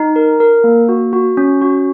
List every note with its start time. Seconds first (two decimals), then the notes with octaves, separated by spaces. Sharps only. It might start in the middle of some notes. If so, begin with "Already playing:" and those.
Already playing: D#4
0.16 A#4
0.40 A#4
0.64 A#3
0.89 F#4
1.13 F#4
1.37 C#4
1.61 F#4